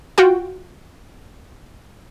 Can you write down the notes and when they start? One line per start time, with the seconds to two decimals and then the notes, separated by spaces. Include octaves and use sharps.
0.18 F4 F#4 G5